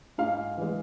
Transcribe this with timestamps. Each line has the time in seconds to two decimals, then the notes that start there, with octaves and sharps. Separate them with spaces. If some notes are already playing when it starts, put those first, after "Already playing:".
0.18 G#2 F5
0.57 E3 G#3